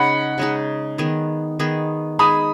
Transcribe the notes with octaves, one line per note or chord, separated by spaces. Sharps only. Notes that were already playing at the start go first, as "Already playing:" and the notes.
Already playing: C#3 G#3 D#4 G#4 F#5 B5
C#3 G#3 D#4 G#4
D#3 B3 G#4
D#3 B3 G#4
G#3 D#4 G#4 B5 D#6